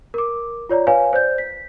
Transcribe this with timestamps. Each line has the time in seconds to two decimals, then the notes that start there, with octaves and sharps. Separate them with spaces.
0.14 A#4 D6
0.69 F4 C#5 D5 A#5
0.87 B4 C#5 F5 G#5
1.13 C5 D5 G6
1.38 B6